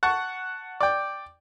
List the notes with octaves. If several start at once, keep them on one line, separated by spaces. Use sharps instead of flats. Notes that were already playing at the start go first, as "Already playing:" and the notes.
F#5 A5 C#6
D5 G5